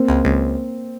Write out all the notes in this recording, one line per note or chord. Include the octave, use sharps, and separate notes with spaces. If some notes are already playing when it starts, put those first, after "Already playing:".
Already playing: A#3 C4
C#2
C#2